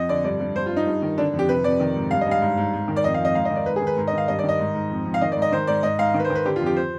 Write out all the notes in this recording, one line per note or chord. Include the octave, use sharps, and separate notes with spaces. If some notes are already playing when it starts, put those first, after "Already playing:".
Already playing: F2 D#5
D3 D5
G2 D5
G2
G2 C5
F4
G2
D#4
G2
D#3
D3 D4
F2
G4
C3 B4
F2 D5
D#3
G#2
G2 F5
D#5
G2
F5
G#2
G#2
G#2
D#3
D5
F2 D#5
F5
F2
D#5
G#2 F5
D#5
D#3
D5
G#2 B4
G#4
D#3
B4
G#2
D#5
D#3 F5
G2 D#5
D5
D#3 D#5
G#2
G#2
F2
F2
F5
D#3 D#5
D5
G#2
D#5
D#3 C5
G#2 D5
G#2 D#5
G#2 F5
D#3
B4
C5
D#3
B4
D3 G4
F4
F2
G4
C5